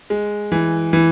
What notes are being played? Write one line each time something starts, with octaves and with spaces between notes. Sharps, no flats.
G#3
E3
E3